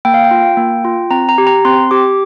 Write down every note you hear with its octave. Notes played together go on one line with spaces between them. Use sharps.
A#3 G5
F5
G5
F4
A#3
F4
C4 A#5
A#5
G4
A#5
C4 C6
G4 D6